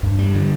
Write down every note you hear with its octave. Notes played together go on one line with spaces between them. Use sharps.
G2
G3
D3